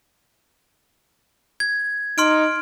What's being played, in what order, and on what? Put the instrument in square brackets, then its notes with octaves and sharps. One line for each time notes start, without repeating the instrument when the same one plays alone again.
[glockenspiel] G#6
[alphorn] D#4 [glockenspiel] C6 F6 D7